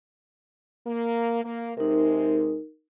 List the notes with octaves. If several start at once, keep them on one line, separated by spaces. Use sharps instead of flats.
A#3
A#3
C3 G#3 D#4 A#4